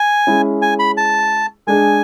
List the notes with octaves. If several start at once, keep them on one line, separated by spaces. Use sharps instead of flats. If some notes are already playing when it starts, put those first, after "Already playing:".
Already playing: G#5
G#3 C#4 E4 G#4
G#5
B5
A5
G#3 D4 G#4 G#5